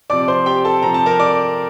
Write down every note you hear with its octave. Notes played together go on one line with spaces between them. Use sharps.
C3 F3 C4 D5 D6
C5 C6
G4 G5
A4 A5
C3 F3 C4 A#5
A5
A#4 A#5
D5 D6